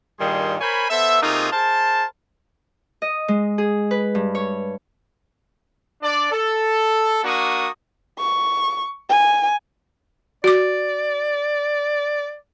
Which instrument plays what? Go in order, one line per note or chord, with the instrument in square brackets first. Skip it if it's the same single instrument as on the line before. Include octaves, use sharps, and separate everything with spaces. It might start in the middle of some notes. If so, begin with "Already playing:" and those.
[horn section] G2 A#2 D#3 G3 G#4 C6
A#4 C5 C#5 G#5 B5
B3 A4 C5 E5
C3 A3 A#3 D#4 F4 G#4
G#4 A#4 C5 A5
[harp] D#5
G#3
G#4
B4
G2
C#5
[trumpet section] D4 D5
A4
A#3 D4 F#4 C#6 D#6
[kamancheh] C#6
G#5
[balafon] F#4 D6 [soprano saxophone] D5